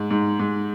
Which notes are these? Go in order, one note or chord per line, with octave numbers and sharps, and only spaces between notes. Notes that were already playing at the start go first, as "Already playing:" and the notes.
Already playing: G#2
G#2
G#2